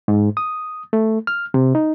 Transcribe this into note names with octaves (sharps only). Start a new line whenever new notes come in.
G#2
D#6
A3
F6
C3
D#4